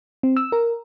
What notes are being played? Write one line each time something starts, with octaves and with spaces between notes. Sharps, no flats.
C4
E6
A#4